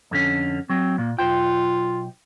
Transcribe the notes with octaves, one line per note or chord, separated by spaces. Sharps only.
F2 D3 C#4
F#3 C4
A#2 A#3
B1 F4 C5 G5